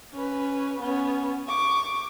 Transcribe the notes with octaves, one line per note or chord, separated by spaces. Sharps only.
C#4 B4
B3 C#4
C#6 D6